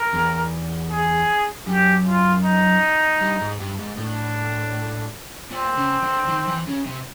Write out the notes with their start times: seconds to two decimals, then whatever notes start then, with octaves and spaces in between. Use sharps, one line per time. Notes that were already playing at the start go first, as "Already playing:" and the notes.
Already playing: A#4
0.13 E2
0.91 G#4
1.67 F#2 G4
2.06 F4
2.44 D#4
3.21 G2
3.41 G#2
3.60 G2
3.79 G#2
3.98 A2 D4
5.51 A#2 C4
5.77 C#3
6.03 D3
6.28 D#3
6.47 E3
6.67 C#3
6.86 C3